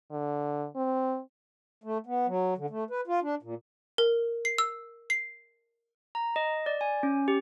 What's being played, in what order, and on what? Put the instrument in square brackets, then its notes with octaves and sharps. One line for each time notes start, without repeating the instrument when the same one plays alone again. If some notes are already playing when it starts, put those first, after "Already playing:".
[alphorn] D3
C4
[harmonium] A3
B3
F#3
D3
A3
B4
F4
D4
A#2
[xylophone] A#4
C7
E6
C7
[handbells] A#5
D#5
D5
G#5
C#4
G4